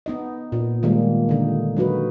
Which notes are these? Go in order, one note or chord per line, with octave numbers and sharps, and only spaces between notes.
B3 D#4 D#5
A#2
D#3 G3 G#3 A#3
D3 D#4
F#3 D#4 F#4 B4